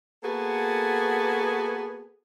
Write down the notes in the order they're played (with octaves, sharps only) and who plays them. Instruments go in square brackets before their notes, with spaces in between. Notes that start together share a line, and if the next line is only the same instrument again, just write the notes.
[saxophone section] A#3 B3 F#4 G#4 A4